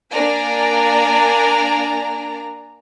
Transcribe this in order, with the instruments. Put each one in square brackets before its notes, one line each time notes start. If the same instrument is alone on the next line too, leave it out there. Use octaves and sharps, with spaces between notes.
[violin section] A#3 D4 D5 G#5 A#5